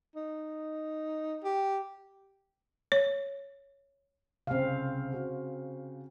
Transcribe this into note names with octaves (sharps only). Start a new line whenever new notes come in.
D#4
G4
C#5
C2 C#3 C4 F5
C#3 F#4